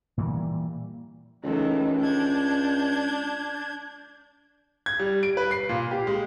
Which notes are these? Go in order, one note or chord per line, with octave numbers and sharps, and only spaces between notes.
A#2 E3 G3
C#2 D#3 E3 A3
D4 G6 G#6
G#6
G3
D7
B4
C7
A#2
G4
G#3